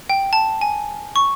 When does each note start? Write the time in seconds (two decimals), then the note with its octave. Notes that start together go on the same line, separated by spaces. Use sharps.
0.10 G5
0.33 A5
0.61 G#5
1.16 C#6